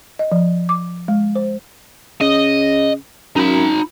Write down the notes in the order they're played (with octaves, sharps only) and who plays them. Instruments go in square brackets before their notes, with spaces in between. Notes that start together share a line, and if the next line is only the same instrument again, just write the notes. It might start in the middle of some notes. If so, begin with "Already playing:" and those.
[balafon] D#5
F3
D6
G#3
C5
[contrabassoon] C#3 [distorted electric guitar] D#5
[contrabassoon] F#2 [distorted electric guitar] D#4 B5